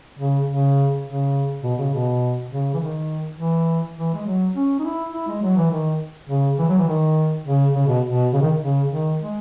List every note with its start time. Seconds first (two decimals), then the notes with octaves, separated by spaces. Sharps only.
0.19 C#3
0.48 C#3
1.06 C#3
1.63 B2
1.78 C#3
1.94 B2
2.51 C#3
2.74 E3
2.80 D#3
3.39 E3
3.97 E3
4.14 G#3
4.26 F#3
4.55 C#4
4.79 D#4
4.84 E4
5.13 E4
5.27 G#3
5.42 F#3
5.56 E3
5.71 D#3
6.29 C#3
6.59 E3
6.69 F#3
6.78 E3
6.88 D#3
7.46 C#3
7.75 C#3
7.87 B2
8.11 B2
8.33 C#3
8.42 D#3
8.62 C#3
8.92 D#3
9.20 G#3